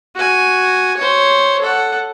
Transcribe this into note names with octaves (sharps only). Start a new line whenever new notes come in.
F#4 G#5
C5 C#5
A4 F#5